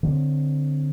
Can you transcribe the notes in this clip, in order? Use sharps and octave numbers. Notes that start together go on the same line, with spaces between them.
D3 C4